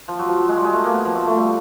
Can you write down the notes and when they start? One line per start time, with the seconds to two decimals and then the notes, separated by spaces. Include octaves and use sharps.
0.08 F3
0.19 F#3
0.28 F3
0.41 F#3
0.49 G#3
0.56 G3
0.64 G#3
0.73 A3
0.84 A#3
0.94 B3
1.05 F3
1.15 A3
1.26 A3
1.37 G3